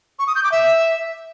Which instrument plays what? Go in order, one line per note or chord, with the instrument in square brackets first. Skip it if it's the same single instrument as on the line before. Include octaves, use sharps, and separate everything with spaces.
[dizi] C#6
D#6
G6
D6
E5